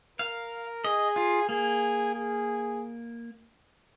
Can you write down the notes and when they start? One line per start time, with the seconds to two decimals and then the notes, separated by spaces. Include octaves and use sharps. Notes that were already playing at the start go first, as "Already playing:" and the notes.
0.19 A#4 F5
0.84 G#4 D#5
1.16 F4
1.49 A#3 G#4
2.14 G#4